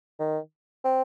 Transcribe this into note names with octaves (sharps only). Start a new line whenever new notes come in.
D#3
C4